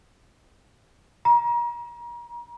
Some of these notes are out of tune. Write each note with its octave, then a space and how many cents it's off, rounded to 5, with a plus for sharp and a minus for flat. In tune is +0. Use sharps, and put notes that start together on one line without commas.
A#5 +35